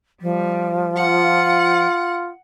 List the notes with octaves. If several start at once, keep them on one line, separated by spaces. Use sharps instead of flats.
F3 G3
F4 F#5